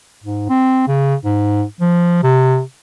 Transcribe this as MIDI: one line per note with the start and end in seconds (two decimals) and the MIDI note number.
0.24 0.49 44
0.49 0.83 60
0.88 1.15 49
1.25 1.63 44
1.80 2.22 53
2.23 2.61 48